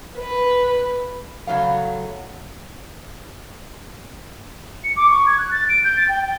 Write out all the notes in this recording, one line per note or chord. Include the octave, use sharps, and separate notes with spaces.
B4
C#3 F#3 A3 F5
C#7
D6
C#6
G#6
F#6
A6
D7
G6
A6
G5
G5